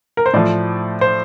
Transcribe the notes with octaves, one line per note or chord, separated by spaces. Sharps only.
A#4
C5
A2 F3 D5
C5